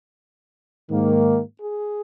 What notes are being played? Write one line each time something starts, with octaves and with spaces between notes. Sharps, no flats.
G#2 D#3 A#3
G#4